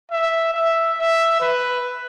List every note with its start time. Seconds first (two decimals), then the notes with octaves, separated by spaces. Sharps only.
0.11 E5
0.54 E5
0.98 E5
1.40 B4